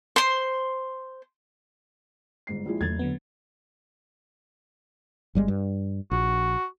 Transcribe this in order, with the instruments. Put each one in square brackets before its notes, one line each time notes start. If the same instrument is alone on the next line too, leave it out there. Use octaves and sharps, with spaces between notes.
[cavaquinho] C5 C6
[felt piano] G1 G#2 C7
A#1 G#3 E4
[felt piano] F#1 G#6 [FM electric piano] E2 A3 A6
[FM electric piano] D3 F#3 B3
[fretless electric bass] G1 G3 G#3
G2
[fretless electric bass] A#1 [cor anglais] F#4